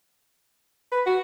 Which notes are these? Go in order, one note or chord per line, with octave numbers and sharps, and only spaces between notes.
B4
F#4